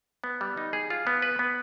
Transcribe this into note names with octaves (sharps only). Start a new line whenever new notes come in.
B3
G3
D#4
G#4
F4
B3
B4
B3